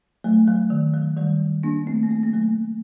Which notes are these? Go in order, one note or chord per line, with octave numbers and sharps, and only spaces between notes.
F#3 A3
F#3
D#3
F#3
D#3 G3
A#3 D4
A3 C4
A#3
A3 C4
A#3
F#3 A3